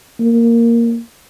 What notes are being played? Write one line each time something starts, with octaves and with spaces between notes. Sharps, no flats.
A#3